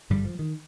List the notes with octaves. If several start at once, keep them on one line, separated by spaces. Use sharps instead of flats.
G#1 G2 D3 G3
F3
D#3